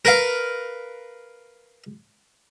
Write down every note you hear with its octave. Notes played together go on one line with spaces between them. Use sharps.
A#4 B4 F5